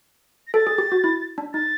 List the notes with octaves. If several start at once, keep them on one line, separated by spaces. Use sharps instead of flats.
A#6
A4 A6
G#4
G4
F#4
E4
D4
D#4 A6